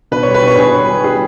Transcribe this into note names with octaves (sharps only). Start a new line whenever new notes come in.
B2 B4
G3 C#5
B4
B2
C#5
B2 G#4 B4
G3
G3
G3 G#4